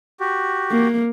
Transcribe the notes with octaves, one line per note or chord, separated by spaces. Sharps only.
F#4 G4
A#3